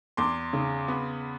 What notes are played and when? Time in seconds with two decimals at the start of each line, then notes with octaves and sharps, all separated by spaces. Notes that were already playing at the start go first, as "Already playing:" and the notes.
0.17 E2 C6 D6
0.53 C#3
0.88 B3